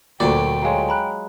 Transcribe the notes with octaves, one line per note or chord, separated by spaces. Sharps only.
D2 A#2 F#3 D5 G5 D6
F#3 G#3 C#5 F5 A#5
A#5 B5 F#6